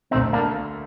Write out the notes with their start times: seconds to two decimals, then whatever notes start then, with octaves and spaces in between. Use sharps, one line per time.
0.11 D2 D3 A3 C4 D#4
0.33 A#3 D4